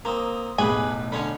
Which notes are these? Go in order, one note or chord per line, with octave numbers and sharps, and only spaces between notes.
A#3 C4 A#5 D#6
B1 E2 A2 G4 G#4 B4 G#5 B5
D3 C#4 C#5 B5